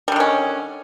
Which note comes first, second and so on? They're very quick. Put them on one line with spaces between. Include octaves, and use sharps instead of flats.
G3 D3 D#3 C#4